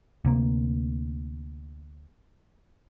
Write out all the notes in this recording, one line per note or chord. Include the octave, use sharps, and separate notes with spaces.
D2 C3 A#3